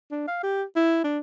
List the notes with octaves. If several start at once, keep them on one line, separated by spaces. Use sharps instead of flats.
D4
F5
G4
E4
D4